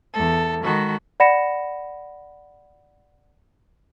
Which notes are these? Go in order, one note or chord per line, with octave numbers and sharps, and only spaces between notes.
E2 A4
D#3 G#3 F#4 A4 B5
D5 F#5 B5 A#6 C#7 E7